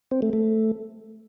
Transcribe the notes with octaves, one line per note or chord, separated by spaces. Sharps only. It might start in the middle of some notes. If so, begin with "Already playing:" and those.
C4
A3
A3